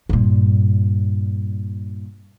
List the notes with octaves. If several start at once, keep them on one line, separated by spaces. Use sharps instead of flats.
G2 A#2